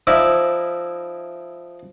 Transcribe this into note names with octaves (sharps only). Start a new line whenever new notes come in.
F3 D#4 E4 D5 E5